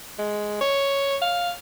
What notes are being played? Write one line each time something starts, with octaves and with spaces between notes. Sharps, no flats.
G#3
C#5
F5